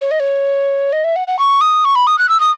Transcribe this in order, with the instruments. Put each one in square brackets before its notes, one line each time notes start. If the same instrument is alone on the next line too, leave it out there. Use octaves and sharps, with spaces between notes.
[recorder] C#5
D#5
C#5
D#5
E5
F#5
F#5
C#6
D#6
C#6
B5
D#6
F#6
E6
D#6